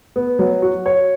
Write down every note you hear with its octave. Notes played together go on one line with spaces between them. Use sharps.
B3
F#3
F#4
C#5